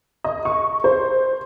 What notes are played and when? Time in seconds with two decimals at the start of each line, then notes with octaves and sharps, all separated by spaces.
0.25 D#5
0.45 C#6
0.84 C5